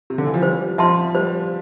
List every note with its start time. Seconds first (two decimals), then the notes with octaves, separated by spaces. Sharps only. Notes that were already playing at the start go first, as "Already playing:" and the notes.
0.10 C3
0.18 D3
0.26 E3
0.34 F3
0.42 G3 C5
0.78 F3 E5 A5 C6
1.15 G3 C5